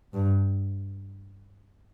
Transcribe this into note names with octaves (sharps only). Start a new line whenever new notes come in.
G2